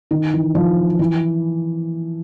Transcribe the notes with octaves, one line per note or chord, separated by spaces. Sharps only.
D#3
E3
F3
E3